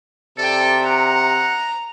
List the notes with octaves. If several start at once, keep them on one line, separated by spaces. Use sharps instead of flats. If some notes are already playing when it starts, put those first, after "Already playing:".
C3 A4 D5 G5
F#5 A#5